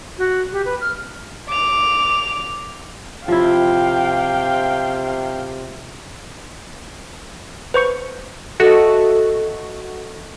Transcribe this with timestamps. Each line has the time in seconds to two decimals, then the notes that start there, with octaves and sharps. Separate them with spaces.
0.18 F#4
0.52 G4
0.65 B4
0.81 F6
1.49 D6 F7
3.28 C3 F3 E4 F5 G5
7.74 B4 C5 C#6 C#7
8.60 A3 F#4 A4 D#5